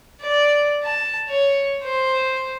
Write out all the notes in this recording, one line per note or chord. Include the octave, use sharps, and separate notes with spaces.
D5
A5
C#5
C5